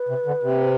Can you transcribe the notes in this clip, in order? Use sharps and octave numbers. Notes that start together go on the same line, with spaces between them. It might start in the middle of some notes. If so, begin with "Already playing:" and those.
Already playing: B4
C3
D3
C3